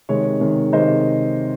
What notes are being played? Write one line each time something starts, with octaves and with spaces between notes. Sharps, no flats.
C3 D#3 G#3 C#5
C3 D#3 G#3
C3 D#3 G#3 C5 D#5